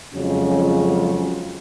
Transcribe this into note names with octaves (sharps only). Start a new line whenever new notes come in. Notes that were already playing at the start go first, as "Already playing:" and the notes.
F2 C#3 F#3 G#3 C#4